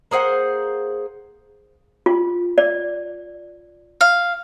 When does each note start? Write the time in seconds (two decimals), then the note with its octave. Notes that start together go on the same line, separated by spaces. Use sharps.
0.11 A#3 G#4 C5 F#5
2.06 F4
2.58 D5
4.01 F5